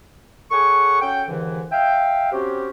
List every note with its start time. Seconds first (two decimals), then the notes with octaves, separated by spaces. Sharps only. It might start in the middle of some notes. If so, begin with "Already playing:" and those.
0.51 G#4 A4 C#5 F#5 C#6
1.01 C#4 F#4 A4 G5
1.29 D#2 G#2 D3 E3
1.72 E5 F5 G5
2.32 F#3 C4 C#4 F#4 G4